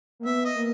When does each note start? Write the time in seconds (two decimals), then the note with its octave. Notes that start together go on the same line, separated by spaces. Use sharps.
0.20 A#3
0.26 B3 E5
0.45 D#5
0.55 A#3